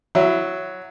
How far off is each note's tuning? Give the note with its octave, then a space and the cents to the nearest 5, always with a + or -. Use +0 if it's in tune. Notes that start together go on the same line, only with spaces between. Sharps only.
F#3 +0 E4 +15